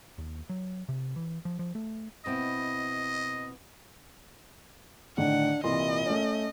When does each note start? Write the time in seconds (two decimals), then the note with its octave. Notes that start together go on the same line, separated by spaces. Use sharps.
0.18 D#2
0.49 F#3
0.89 C3
1.16 E3
1.45 F3
1.59 F3
1.75 A3
2.26 B2 C4 E4 D#5
5.18 A2 D3 D#3 D4 F#5
5.64 C2 A#2 E3 D#5 C6
6.06 A3 C#4